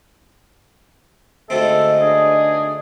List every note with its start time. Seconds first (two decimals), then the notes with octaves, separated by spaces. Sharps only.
1.50 D2 G#2 A3 C4 A4 D#5
2.01 D4 G#4